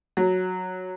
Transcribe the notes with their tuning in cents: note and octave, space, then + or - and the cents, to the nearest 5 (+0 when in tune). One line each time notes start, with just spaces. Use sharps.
F#3 -5